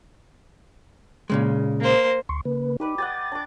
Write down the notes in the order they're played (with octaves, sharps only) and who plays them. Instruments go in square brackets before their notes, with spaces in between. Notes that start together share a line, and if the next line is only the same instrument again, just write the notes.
[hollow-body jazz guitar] A#2 C#3 G#3
[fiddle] A#3 C5
[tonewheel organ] D2 C6 C#6
C#3 A#3 B4
[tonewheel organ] D#4 [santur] G4 B4 D5
[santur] G4 D#5 F#5 [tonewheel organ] A6
[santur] D4 D6